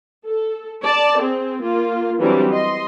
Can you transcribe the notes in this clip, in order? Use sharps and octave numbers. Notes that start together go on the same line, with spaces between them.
A4
D5 A5
C4 G#4
A#3 F4
E3 F#3 G3 C4 D4
D#5 C6